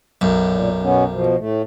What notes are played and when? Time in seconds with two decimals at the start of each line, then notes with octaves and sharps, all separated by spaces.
0.21 B1 F#2
0.48 A#2
0.82 B2 B3 C#4
1.11 B2 F3
1.38 A2 A3